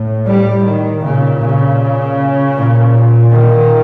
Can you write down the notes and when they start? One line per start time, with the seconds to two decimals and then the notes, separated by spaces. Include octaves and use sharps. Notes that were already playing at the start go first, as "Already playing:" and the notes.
Already playing: A2
0.25 G3
0.62 D#3
1.02 A#2 C#3
1.39 C#3
2.54 A#2
3.30 D#3